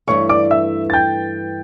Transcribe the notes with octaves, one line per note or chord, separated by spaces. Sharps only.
G2 E3 A3 C#5 C#6
D5 D6
E5 E6
A6
G5 G6